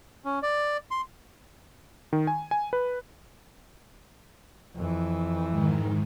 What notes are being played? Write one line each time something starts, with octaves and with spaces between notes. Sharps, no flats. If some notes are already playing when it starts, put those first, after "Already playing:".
C#4
D5
C6
D#3
G#5
G#5
B4
F2 E3
G#2 D#3